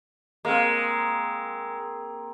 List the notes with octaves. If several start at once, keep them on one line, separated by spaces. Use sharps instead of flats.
G#3 A#3 C4